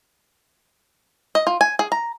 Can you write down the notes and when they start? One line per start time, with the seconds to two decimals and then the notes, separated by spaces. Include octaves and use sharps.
1.35 D#5
1.47 F4
1.61 G#5
1.79 G#4
1.92 A#5